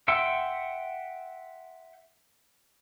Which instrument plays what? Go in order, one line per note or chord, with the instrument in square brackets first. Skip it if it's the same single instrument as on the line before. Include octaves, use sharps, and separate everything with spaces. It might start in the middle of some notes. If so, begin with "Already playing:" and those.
[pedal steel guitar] E5 F#5 G5 C6 E6